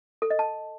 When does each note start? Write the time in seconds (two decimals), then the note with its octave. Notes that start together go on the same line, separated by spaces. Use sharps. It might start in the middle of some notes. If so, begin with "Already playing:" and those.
0.22 A4
0.30 D#5
0.39 A5